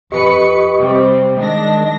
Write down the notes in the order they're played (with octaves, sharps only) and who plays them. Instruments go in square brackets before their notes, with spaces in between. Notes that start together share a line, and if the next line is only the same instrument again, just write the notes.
[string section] F2 B4 C#7 [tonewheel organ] G4 D#5 C#6
[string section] C3 G3 C4
[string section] D#3 D4 A#6 [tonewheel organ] G#3 D#5